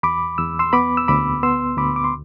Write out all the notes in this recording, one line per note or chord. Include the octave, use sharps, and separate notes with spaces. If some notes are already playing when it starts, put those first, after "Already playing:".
E2 B5 D6
E2 E6
C6 E6
B3 B5 D6
E6
D2 B5 D6
B3 C6 E6
D2 B5 D6
D6
C6